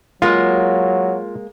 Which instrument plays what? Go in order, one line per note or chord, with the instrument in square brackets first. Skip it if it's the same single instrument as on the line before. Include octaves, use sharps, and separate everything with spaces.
[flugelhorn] F#3 [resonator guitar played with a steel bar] G#3 A#3 [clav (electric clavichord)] F4